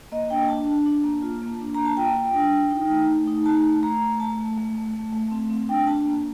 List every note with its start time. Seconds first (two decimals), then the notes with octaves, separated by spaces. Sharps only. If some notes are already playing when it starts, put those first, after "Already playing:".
0.12 A#3 D#5
0.30 D4 G5
0.48 D4 A5
0.67 D4
0.86 D4
1.04 A#3
1.22 F4
1.42 A#3
1.61 D4
1.75 A#3 A#5
1.85 A5
1.97 F4 G5
2.16 F4
2.34 D4
2.53 F4
2.71 D#4
2.90 A3
3.08 A3
3.27 D#4
3.46 A3 A5
3.65 A3
3.83 A3 A#5
4.02 A3
4.19 A3 A5
4.38 A3
4.58 A3
4.75 A3
4.94 A3
5.13 A3
5.31 C4
5.50 C4
5.69 D4 G5
5.87 D4 A5
6.06 A#3